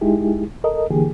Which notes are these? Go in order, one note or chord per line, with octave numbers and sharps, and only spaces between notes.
G#3 D#4 E4 G4 G#4
A4 A#4 D#5
D3 E3 A#3 G4 G#4